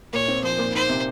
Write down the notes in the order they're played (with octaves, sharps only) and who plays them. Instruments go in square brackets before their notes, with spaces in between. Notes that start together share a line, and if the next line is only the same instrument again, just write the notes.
[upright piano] A#2 [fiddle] C#5
[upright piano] C4
[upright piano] F3 [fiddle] C5
[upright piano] A#2
[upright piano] D#4 [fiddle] C5
[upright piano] C3